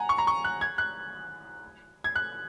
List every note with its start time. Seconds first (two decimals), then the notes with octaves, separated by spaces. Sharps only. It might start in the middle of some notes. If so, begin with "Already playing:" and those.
Already playing: F#5 G#5 A#5
0.09 C#6
0.18 A#5
0.27 C#6
0.44 F#6
0.61 G#6
0.78 F#6
2.04 G#6
2.16 F#6